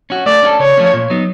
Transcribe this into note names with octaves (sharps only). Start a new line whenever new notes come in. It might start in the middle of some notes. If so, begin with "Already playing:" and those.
C#4 F#4
A3 D5
C#4 F#4 A4
C#3 C#5
F3 A3 C#4
A#2
F#3 B3 D#4